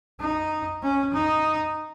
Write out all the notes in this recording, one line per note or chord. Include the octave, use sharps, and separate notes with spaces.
D#4
C#4
D#4